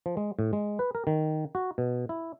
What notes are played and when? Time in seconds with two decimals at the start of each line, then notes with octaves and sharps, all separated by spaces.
0.06 F3
0.17 G#3
0.39 A2
0.53 G#3
0.79 B4
0.95 A#4
1.07 D#3
1.55 F#4
1.78 B2
2.09 E4